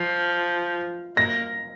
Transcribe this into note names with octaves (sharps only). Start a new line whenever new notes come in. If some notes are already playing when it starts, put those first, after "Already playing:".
Already playing: F3 C7
A#3 A#6